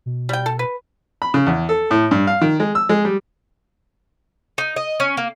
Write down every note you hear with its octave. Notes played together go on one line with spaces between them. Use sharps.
B2
G3 G5
A4
B4
B5
C#3
E2
A4
A2
G2
F5
D#3
G#3
E6
G#3
G3
D#4
D#5
C#4
A#3